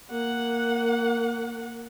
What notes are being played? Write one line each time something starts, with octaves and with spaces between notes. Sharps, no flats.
A#3 F#5